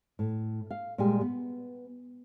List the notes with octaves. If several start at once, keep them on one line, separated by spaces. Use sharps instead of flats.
A2
F5
A#2 G3 G#3 G4 G#5
B3